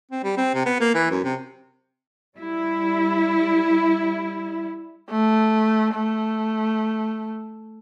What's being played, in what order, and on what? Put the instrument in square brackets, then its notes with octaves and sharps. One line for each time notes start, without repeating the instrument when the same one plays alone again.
[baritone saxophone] C4
G3
C4
C3
B3
A#3
E3
F#2
C3
[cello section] G3 E4
[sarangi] A3
A3